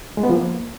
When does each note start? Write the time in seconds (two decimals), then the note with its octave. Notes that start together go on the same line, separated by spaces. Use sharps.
0.17 G#3
0.23 B3
0.29 F3
0.36 A#3